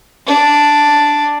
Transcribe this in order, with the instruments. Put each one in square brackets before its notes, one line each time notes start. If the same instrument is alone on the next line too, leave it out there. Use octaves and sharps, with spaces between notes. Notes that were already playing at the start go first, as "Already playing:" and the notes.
[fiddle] D4